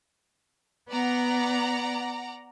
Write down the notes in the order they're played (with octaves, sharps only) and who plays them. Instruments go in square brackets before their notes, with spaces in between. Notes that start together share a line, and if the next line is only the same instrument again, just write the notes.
[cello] B3 [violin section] D5 F#5 A#5